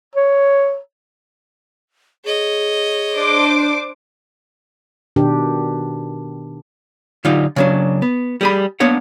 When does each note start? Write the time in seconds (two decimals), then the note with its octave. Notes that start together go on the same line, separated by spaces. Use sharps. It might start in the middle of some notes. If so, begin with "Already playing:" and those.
0.15 C#5
2.25 G#4 C#5 D#5
3.15 D4 C5 D6
5.16 B2 D#3 D4 G4
7.25 D3 F#3 D#4 F4 G4
7.56 C#3 F#3 D4
8.02 B3
8.41 G3 G#4 B5
8.80 A#3 B3 D4 C#5 F#5